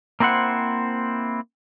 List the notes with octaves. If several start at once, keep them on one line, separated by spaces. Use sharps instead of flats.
A#3 C4 E4 C5 F#5